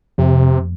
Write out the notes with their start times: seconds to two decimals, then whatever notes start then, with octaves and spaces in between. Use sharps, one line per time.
0.18 F2 C3